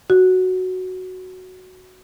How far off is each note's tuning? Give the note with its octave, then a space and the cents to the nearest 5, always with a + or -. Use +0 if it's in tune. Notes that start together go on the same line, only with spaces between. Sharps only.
F#4 +0